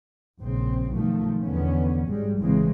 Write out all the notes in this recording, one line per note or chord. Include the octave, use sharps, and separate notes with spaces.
A#1 C#3 C4
B1 D#3 F3 A3
E2 D3 B3 C#4
G#1 G3 G#3
A1 A2 C#3 E3 G#3 C4